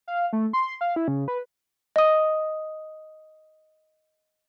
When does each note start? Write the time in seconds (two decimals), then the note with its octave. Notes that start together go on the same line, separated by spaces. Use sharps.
0.08 F5
0.33 A3
0.53 C6
0.81 F5
0.96 E4
1.08 C#3
1.28 B4
1.96 D#5 D#6